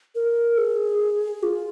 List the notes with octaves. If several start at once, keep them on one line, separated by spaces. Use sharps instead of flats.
A#4
G#4
F4